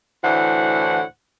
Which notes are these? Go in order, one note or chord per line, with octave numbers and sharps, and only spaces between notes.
D2 A2 D3 E3 C5 F#5